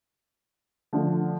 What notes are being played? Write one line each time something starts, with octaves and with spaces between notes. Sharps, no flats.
D3 F3 A3